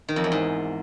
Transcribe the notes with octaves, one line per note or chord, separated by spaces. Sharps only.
D#3
F2
E2
G#2